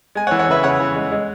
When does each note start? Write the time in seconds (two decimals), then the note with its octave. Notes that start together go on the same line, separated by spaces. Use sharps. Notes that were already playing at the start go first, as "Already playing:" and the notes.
0.15 G#3 G#5
0.27 C#5 F#5
0.31 E3
0.39 C#5 F#5
0.48 C#3 B4 E5
0.63 C#3 C#5 F#5
0.80 E3
0.96 G#3
1.12 G#3